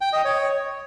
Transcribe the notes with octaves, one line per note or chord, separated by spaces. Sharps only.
G5
D#5
C#5